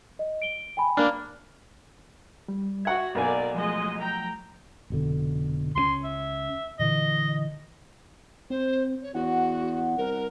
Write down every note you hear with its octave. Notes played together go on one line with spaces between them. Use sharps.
D#5
D7 G7
G5 G#5 B5
A#3 D4 B5 F6
G3
F#4 E5 F#5 G#6
B1 A#3 A#4 D5 G#5
F3 F#3 G#3 A3 D#5
G5 A#5
F1 B2 D3
C#2 F#3 C#4 C6
E5
A#2 D3 E3 D#5
C4 C5
C#5
E2 F#4 F#5
C2 A#4